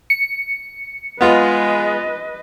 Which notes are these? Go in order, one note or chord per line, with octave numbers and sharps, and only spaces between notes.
C#7
G#3 B3 F4 B4 D#5